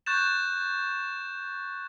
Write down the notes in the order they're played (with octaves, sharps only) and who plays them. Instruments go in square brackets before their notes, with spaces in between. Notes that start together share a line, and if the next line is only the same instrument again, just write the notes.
[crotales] C#6 F#6 G6 A6 E7